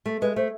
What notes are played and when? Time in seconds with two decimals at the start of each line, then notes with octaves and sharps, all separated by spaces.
0.06 A3
0.21 G#3 B4
0.36 A3 C5